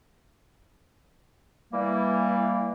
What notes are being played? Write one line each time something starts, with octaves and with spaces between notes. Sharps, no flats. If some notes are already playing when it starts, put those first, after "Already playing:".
E3 G3 A#3